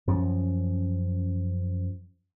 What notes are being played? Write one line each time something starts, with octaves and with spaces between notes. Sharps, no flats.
F#2 F3 C#4